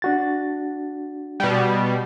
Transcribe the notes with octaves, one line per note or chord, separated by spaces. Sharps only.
D4 F#4 A6
B2 G3